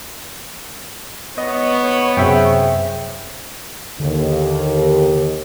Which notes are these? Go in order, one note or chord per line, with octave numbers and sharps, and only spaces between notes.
B3 C#5 D#5
F#2 C3 G#4 C5 E5 G5
D#2 D3